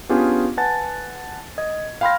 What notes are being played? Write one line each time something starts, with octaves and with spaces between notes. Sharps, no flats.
B3 C#4 D4 F4 G4 G#4
B4 F#5 G#5 A5 A6
D#5 G#6
F5 G5 B5 C6 F6 A#6